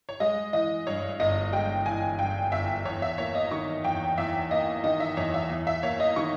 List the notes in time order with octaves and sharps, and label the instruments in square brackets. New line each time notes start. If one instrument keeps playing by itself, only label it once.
[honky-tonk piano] C#5
G#3 D#5
E3 D#5
G2 C#5
G1 D#5
G#3 G5
E3 G#5
G2 G5
G1 E5
E2 C#5
E5
A#3 C#5
D#5
D#3 C#6
E2 G5
E2 E5
A#3 D#5
D#3 D#5
E5
E2 C#5
E5
E2
E5
A#3 C#5
D#5
D#3 C#6